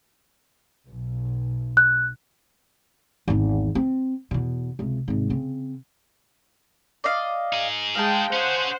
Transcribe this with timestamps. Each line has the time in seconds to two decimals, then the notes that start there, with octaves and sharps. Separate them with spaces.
0.89 B1
1.77 F#6
3.28 G#1 E2
3.75 C4
4.31 E2 B2
4.79 C#2 C3
5.08 G#1 C3
5.30 C#3 C4
7.04 D5 D#5 F5
7.53 D#4 G#4
7.95 G#3 F5 G5 A5
8.33 C#4 G#4 C5 F#5